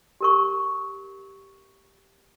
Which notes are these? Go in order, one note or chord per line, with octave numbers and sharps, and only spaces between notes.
G4 A#4 C#6